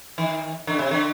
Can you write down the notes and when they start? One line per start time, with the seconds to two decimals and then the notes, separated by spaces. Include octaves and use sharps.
0.18 D#3
0.67 D3
0.79 C3
0.91 D3